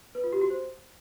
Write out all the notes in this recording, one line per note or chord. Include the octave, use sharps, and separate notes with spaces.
B4
F4
G4
F#4
C5